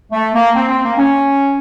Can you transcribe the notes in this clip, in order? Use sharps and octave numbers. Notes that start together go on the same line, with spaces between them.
A3
A#3
C4
C4
A#3
C#4